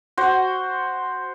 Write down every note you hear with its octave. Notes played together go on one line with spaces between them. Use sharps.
F#4 C5